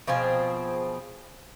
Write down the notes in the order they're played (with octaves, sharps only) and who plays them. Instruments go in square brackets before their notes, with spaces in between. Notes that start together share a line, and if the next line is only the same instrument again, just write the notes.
[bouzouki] B2 F3 C4 G#4